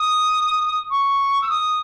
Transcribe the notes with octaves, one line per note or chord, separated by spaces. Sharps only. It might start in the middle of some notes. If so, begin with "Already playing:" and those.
Already playing: D#6
C#6
E6
D#6